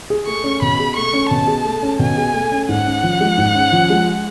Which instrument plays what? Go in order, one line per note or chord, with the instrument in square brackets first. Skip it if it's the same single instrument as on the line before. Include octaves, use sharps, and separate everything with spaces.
[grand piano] G#4
[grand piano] A3 [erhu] C#6
[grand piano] C#4
[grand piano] B2 [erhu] B5
[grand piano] G#4
[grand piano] A3 [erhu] C#6
[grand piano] C#4
[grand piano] B2 [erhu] A5
[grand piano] G#4
A3
C#4
[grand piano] B2 [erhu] G#5
[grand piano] G#4
A3
C#4
[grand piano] G#2 [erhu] F#5
[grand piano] C#4
F3
G#3
G#2
C#4
F3
G#3